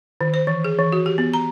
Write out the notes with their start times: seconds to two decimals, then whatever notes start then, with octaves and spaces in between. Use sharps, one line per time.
0.21 D#3
0.34 C5
0.47 E3
0.64 G#4
0.79 E3
0.92 F#4
1.06 G4
1.18 B3
1.34 A#5